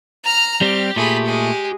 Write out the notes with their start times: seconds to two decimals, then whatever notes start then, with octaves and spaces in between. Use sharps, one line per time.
0.24 A#5 F6
0.61 G3 C4 G4 F6
0.96 A#2 A3 G#4 B5
1.25 G#3 G#4